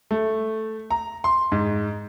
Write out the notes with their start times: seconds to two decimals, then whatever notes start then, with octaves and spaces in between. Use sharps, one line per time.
0.11 A3
0.91 A#5
1.24 C6
1.52 G#2